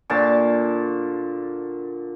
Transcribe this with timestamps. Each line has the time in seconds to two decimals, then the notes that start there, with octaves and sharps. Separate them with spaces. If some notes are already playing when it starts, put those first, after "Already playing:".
0.10 A#2 D3 A5 C#6